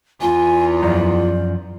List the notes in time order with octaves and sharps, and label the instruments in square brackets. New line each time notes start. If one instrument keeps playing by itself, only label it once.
[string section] E2 [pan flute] F4 [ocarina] G#5
[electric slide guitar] F#2 F3 A#5 [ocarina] D5